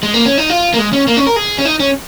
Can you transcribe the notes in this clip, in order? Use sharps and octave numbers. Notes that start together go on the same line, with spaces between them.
G#3
A#3
C#4
D#4
F4
A#3
G#3
C#4
A#3
C#4
A#4
G#4
C#4
D#4
C#4